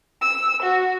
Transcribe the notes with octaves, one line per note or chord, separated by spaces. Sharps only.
E6
F#4